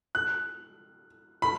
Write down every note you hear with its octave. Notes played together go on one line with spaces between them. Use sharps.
F#6
B5